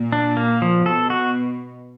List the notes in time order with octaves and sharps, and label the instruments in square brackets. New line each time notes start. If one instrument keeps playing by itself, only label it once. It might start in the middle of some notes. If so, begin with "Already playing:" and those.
Already playing: [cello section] A#2
[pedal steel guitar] D4
A#3
F3
[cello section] B2 [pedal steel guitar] A4
[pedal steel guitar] F#4